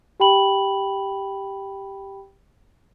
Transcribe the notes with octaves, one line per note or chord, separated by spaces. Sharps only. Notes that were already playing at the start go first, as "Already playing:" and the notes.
G4 G5 B5 F#7